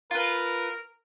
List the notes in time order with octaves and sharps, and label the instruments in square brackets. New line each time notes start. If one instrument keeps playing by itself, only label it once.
[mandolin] F4 B4 [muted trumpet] A#4